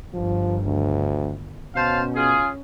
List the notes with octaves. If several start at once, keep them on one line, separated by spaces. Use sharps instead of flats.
G1 D#3 F3
D2
B2 C#4 C5 F5 A5
F4 G#4